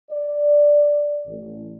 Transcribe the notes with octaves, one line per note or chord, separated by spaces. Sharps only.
D5
A1